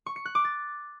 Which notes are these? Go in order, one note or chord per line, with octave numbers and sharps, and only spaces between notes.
C#6
C#7
F#6
D6
A6